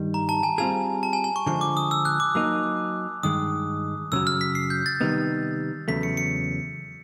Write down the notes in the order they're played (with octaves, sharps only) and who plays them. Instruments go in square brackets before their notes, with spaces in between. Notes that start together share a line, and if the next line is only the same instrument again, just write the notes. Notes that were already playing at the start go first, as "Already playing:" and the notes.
Already playing: [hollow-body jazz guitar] G2 D#3 G3
[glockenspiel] A#5
A5
G#5
[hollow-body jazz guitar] G3 C4 F4 G#4 [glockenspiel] G#5
[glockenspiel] A5
G#5
G#5
C#6
[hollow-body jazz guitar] D3 F3 G#3 [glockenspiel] C#6
[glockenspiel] D6
D#6
E6
F#6
D6
[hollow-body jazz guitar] F#3 A#3 D#4
[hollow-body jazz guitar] G2 D#3 G#3 [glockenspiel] D#6
[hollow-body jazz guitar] F#2 C#3 F#3 [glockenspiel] E6
[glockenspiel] F6
B6
C7
G6
A6
[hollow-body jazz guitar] C3 D#3 G3 B3 D#4
[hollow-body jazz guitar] E2 C#3 F#3 A3 [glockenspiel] B6
[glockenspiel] C#7
C#7